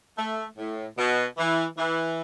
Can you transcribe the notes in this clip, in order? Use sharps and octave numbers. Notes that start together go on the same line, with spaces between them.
A3
A2
B2
E3
E3